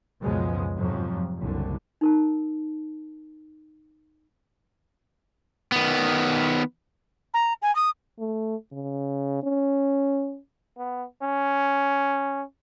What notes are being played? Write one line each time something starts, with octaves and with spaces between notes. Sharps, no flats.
C#2 F#2 B2 F3 G#3
F2 G#2 C3 F3 F#3
F#1 C2 D3
D#4 A#4 A5
D#3 B3
A#5
G#5
D#6
A3
C#3
C#4
B3
C#4